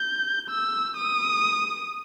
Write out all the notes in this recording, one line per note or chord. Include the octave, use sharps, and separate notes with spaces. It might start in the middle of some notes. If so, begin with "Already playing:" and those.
Already playing: G6
E6
D#6